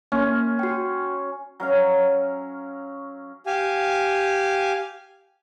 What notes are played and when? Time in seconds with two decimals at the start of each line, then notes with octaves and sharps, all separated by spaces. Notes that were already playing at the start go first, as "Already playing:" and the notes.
0.12 A#3 C#4
0.59 F#4 G5
1.60 F#3 C#4 F5
3.46 G4 F5 G#5